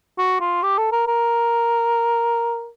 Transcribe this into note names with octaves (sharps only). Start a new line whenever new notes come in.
F#4
F4
G4
A4
A#4
A#4